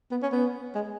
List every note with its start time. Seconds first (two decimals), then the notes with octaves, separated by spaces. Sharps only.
0.11 B3
0.22 C#4
0.32 B3
0.75 G#3